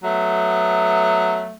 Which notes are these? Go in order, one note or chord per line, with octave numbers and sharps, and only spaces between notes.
F#3 A3 B3